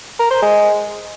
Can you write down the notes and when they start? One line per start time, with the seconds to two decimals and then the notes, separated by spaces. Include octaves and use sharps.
0.20 A#4
0.31 C5
0.42 G#3